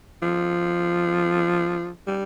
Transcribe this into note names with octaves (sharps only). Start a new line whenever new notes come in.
F3
G3